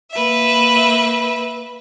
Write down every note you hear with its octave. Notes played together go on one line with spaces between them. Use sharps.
A#3 B4 E5